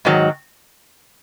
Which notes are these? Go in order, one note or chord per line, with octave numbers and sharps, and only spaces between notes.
G#2 D#3 F#3